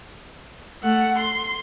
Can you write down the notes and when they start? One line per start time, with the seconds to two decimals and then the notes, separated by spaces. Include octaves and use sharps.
0.83 A3 F#5
1.17 C6